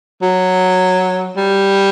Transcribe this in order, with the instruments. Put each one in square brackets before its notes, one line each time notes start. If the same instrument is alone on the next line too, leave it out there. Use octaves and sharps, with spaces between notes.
[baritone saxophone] F#3
G3